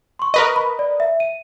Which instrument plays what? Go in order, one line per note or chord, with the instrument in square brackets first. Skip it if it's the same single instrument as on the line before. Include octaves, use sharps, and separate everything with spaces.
[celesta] C6 C#6
[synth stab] A#4 B4 D#5
[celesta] B5
D5
E5
D#7